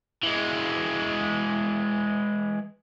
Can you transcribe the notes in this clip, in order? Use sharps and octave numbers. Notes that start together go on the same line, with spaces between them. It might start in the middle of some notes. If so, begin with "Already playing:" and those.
E3 G#3